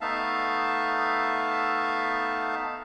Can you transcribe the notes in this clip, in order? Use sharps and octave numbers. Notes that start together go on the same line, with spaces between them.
A3 B3 D#4 E5 F5 A5